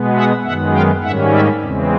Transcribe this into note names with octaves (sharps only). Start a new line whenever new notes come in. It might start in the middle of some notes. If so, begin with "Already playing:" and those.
Already playing: B2 G#3 B3
E5 F#5
F#2 D#3 G#3 B3 E5 F#5
F5 G5
G#2 D#3 G3 A#3 C#4 E5 F#5
D5 E5
E2 C#3 E3 G#3 C4